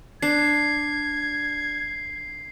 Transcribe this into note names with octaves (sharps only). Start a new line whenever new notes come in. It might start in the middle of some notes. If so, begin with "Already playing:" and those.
D4 G#6 C7